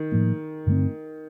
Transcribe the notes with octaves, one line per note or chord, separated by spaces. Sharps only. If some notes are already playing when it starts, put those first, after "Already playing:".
Already playing: D#3
A2 F3 A#3
G2 D3 A3 C4